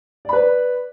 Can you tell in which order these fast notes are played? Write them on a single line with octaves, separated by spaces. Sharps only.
D5 B5 B4